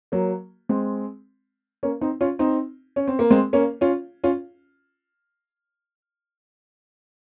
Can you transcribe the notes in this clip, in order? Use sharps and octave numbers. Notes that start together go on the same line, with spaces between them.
F#3 A#3
G#3 C4
A#3 C#4
C4 D#4
C#4 F4
C4 D#4
C#4
C4
A#3
G#3 C4
A#3 C#4
C#4 F4
C#4 F4